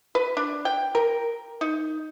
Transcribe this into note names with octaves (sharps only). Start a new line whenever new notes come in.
B4
D4
G5
A#4
D#4